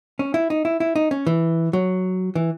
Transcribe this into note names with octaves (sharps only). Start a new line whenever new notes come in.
C#4
E4
D#4
E4
E4
D#4
C#4
E3
F#3
E3